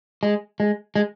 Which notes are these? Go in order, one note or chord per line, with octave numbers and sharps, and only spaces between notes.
G#3
G#3
G#3